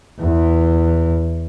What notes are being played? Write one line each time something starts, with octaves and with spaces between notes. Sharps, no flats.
E2 E3